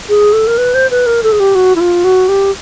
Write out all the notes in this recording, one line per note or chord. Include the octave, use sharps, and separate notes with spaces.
G#4
A4
A#4
B4
C5
B4
A#4
A4
G#4
G4
F#4
E4
F4
F#4
G4